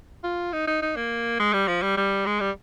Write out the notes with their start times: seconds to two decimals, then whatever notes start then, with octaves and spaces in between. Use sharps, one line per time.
0.24 F4
0.53 D#4
0.67 D#4
0.82 D#4
0.96 A#3
1.40 G#3
1.53 G3
1.68 F3
1.82 G3
1.97 G3
2.26 G#3
2.40 G3